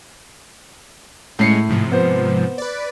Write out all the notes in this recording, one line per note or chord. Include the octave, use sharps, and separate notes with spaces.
A2 G#3 C#4 C7 C#7
G#2 C3 F3
B3 C5
B4 D5